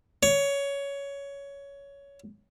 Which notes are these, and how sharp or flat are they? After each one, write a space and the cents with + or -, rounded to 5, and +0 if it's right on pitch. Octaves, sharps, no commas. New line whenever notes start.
C#5 +15